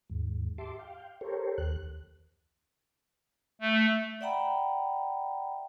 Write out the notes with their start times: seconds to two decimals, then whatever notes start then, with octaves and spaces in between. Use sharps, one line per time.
0.10 D#2 G#2
0.58 G4 E5 A5 C6 D6
0.79 F5 G5
1.21 G4 A4 A#4 C5 C#5
1.58 D#2 F#6
3.61 A3
4.21 D5 E5 F#5 G5 A#5 B5